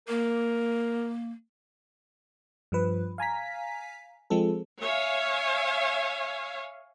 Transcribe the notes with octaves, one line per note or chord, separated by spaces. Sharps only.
A#3 A#4
G2 F3 B4
F5 G#5 A#5 B6
F3 G#3 C4 A4
C#5 E5 F5 G#5